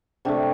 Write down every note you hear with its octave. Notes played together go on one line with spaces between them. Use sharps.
C3 A3 D4 G4